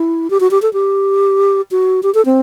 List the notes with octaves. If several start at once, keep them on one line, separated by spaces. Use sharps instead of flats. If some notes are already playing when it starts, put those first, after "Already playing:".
Already playing: E4
G4
F#4
G4
A4
G4
F#4
G4
A4
C4